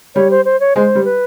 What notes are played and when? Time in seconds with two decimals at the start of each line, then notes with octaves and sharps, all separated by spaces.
0.15 G3 C#5
0.31 C5
0.45 C5
0.60 C#5
0.76 G#3 C5
0.95 G3
1.05 B4